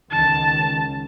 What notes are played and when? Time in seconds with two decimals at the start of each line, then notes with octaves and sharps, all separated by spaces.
0.11 C#2 D#3 A5